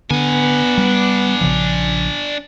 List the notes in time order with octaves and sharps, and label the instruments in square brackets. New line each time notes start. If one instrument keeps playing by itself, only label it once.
[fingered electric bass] D3 [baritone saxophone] B3 [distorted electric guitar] D4 G#5
[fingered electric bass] G3
A#1 C#3 F3